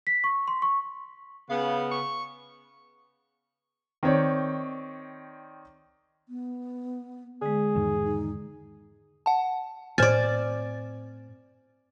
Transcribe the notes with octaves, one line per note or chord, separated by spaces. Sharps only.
B6
C#6
C6
C#6
C#3 B3 F5
C#6
D#3 C4 C#5 D5
B3
D3 G#3 G#4
E2 G#2 D#3 D#4
D#4
F#5 A5
A2 C4 C5 D5 G#5 F6 A6